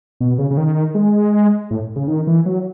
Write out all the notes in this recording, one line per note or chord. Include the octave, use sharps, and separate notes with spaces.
B2
C#3
C#3
D#3
G#3
A2
C#3
D#3
E3
F#3